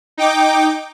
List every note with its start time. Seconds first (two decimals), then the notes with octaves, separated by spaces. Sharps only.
0.17 D#4 G5 D6